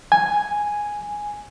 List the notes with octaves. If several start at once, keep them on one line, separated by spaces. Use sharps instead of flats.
G#5